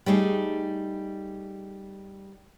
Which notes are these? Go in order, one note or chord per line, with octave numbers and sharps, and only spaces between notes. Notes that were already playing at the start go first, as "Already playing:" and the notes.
G3 A3 D#4 G#4